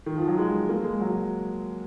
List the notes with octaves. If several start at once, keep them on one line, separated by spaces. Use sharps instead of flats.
D#3
F3
F#3
G#3
A#3
G#3
F#3